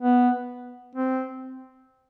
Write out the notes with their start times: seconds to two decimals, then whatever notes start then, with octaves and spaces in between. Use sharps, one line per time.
0.02 B3
0.96 C4